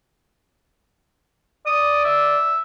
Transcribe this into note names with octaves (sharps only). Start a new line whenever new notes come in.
D5 D#6
E5